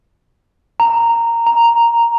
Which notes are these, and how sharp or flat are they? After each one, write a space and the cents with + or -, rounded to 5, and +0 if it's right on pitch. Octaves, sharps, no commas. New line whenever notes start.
A#5 -10
A#5 +0